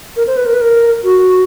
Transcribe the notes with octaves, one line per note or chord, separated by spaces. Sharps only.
A#4
C5
B4
A#4
B4
A#4
F#4